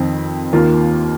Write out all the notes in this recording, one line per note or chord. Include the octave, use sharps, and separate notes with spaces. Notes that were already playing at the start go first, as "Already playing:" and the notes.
Already playing: F2 D#3 C4
D#2 D#3 A#3 F4